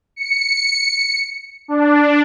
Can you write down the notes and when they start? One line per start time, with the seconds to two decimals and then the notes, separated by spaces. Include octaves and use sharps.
0.16 C#7
1.68 D4